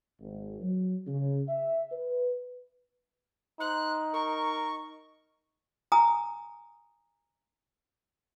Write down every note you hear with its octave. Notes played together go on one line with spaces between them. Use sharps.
G#1
F#3
C#3
E5
B4
D#4 C5 F#6
A#4 C#6
G#5 A#5 D#6